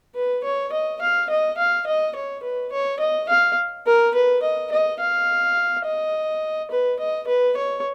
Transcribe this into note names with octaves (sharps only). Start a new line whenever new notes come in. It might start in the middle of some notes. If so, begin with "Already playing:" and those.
B4
C#5
D#5
F5
D#5
F5
D#5
C#5
B4
C#5
D#5
F5
A#4
B4
D#5
D#5
F5
D#5
B4
D#5
B4
C#5